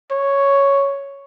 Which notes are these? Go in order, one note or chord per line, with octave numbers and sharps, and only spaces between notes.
C#5